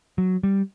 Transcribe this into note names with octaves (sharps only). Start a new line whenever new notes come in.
F#3
G3